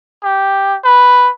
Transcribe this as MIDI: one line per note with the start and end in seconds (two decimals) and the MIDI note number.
0.23 0.77 67
0.84 1.30 71